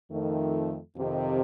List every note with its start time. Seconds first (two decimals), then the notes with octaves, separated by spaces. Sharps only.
0.11 F2 D#3 A3
0.96 F2 C3 D#3